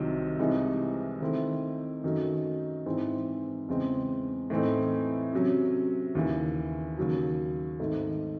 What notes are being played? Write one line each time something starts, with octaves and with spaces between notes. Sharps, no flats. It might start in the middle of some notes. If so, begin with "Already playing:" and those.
Already playing: C2 C3 D#3 F#3
C2 C3 E3 G#3 D#4
D#3 A3 C4 E4
F#2 D#3 F#3 A3 D#4
G#2 E3 G#3 C4 E4
E2 C#3 G#3 C4
A2 E3 A3 C4 D#4
C3 F#3 C#4
D#2 C#3 E3
D#2 C#3 F#3
G#1 G#2 D#3 A3